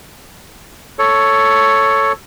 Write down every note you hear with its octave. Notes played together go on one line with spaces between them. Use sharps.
A4 C#5